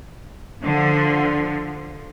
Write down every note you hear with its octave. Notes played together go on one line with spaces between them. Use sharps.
D3 F3